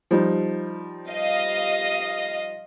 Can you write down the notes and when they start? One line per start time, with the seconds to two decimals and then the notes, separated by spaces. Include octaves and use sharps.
0.11 F3 G3 D#4
1.10 D#5 F5